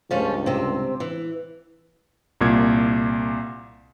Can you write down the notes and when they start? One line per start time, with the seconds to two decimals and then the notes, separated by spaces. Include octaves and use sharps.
0.11 C#2 G2 F3 A3 C#4
0.46 C3 C4
1.00 E3
2.41 C2 A#2 G#6